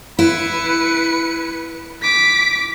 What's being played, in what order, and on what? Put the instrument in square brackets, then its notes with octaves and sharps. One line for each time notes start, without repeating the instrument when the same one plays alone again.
[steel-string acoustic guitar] E4 [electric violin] B4 C#7
[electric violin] D6 B6